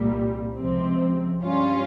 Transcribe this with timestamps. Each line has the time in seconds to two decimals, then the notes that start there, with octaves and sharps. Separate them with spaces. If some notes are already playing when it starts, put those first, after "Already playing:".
Already playing: C2 A#2 G3
0.54 C#2 C3 F3 C4
1.41 G2 G3 C#4 F4